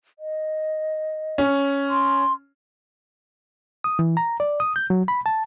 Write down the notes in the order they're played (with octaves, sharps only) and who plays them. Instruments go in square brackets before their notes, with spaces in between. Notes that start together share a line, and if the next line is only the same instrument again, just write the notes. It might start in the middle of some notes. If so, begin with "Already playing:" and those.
[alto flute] D#5
[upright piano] C#4
[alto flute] C6
[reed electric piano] D#6
E3
A#5
D5
D#6
G6
F#3
B5
A5